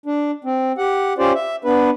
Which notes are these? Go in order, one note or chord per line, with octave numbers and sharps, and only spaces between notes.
D4
C4
G4 F#5
C#4 F4 G4 C5 D5
E5
B3 D4 B4